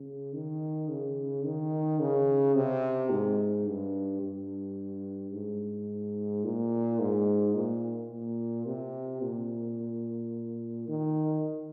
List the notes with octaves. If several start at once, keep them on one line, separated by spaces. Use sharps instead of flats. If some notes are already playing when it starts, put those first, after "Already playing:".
Already playing: C#3
D#3
C#3
D#3
C#3
C3
G#2
G2
G2
G#2
A#2
G#2
A#2
A#2
C3
A#2
D#3